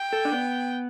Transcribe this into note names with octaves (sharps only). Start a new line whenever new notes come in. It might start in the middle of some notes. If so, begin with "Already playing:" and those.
Already playing: G5
A4
D4
B3